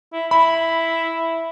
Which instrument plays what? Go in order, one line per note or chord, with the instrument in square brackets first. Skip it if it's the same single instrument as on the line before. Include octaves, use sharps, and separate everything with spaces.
[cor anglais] E4
[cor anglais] E4 [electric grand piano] B5